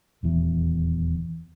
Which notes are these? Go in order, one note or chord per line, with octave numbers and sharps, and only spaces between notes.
D#1 E2 E3